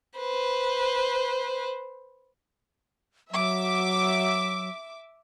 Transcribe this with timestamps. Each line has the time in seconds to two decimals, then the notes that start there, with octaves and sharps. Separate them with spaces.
0.18 B4 C5
3.31 F#3 E5 D6